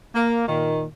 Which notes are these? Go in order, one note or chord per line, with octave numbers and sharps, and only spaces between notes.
A#3
A#2 D#3